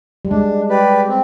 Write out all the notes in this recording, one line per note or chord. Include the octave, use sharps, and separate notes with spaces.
G3
G#3 D4
G4 B4 D5
C4